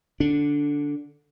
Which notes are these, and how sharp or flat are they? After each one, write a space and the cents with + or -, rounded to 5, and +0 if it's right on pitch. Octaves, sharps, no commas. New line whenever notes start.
D3 +0 D4 -10